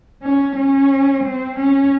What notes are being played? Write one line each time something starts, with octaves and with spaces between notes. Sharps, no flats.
C#4
C#4
C4
C#4